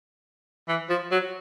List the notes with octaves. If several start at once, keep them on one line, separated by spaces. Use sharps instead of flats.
E3
F3
F#3